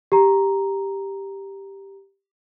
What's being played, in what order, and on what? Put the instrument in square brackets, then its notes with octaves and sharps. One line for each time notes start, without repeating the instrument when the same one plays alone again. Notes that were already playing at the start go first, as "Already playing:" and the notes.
[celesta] G4 A#5